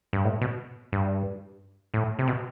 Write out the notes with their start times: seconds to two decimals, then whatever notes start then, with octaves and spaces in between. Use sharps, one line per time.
0.13 G2
0.25 A2
0.41 B2
0.92 G2
1.94 A2
2.19 C3
2.28 B2